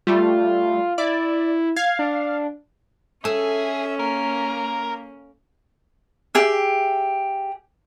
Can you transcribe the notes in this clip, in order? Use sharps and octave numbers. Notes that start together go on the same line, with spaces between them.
G3 A3 F4
E4 D5
F5 G#6
D4
C#4 G#4 A4 E5
A#3 A#4
G4 G#4 E5